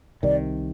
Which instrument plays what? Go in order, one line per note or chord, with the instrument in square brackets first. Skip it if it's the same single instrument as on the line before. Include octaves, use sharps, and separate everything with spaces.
[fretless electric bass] C2 C3 D#3 [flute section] D5